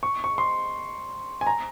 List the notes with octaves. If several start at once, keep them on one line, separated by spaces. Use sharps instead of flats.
C#6
C#6
C6
G#5
A#5